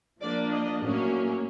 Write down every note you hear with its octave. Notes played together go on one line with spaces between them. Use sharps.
F3 A#3 D4 D5
D#5
A2 F#3 A#3 C#4